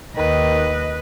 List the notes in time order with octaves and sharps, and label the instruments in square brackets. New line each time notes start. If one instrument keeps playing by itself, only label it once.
[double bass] D#2 [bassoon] D#3 [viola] B4 [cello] D#5